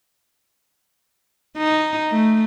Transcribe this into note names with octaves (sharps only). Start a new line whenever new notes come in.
D#4
A3